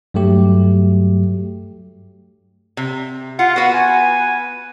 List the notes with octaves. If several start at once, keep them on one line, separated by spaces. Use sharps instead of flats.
G2 F#3 A3 G4
C3
F4 F#5
B3 F#4 B4
G#5